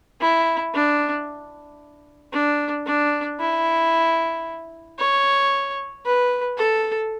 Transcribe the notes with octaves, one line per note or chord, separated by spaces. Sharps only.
E4
D4
D4
D4
E4
C#5
B4
A4